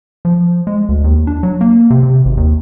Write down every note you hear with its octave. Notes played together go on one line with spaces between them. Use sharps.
F3
G#3
D2
D#2
D4
F#3
A#3
C3
C3
G#1
D#2